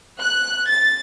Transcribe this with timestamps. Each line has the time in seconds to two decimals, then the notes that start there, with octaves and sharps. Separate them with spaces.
0.20 F#6
0.70 A6